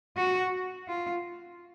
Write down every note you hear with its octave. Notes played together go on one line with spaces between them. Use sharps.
F#4
F4